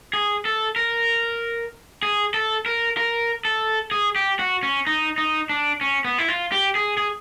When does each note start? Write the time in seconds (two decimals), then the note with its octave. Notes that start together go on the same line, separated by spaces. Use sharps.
0.13 G#4
0.45 A4
0.76 A#4
2.03 G#4
2.34 A4
2.66 A#4
2.97 A#4
3.45 A4
3.91 G#4
4.16 G4
4.39 F#4
4.63 C#4
4.87 D#4
5.18 D#4
5.49 D4
5.81 C#4
6.05 B3
6.18 E4
6.28 F4
6.52 G4
6.75 G#4
6.97 G#4